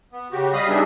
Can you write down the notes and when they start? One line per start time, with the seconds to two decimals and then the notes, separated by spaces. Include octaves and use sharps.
0.13 B3
0.32 C#3 F#4 G4
0.53 G3 D#5 F5 B5 D#6
0.69 G3 B3 D4 D#4 G#4 E5